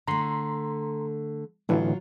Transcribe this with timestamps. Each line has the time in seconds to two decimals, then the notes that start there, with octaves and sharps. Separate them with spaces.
0.08 D3 A3 A#5 C6
1.69 A2 D3 E3 F#3 F4